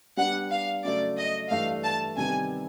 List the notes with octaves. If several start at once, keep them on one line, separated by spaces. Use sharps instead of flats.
G3 B3 D4 F#5
F5
C#3 F#3 A3 D5
D#5
G2 E3 A3 D4 F5
A5
C3 D#3 G3 B3 G#5